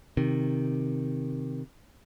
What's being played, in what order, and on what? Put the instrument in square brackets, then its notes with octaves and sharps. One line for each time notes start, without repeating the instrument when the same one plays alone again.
[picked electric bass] C3 D#3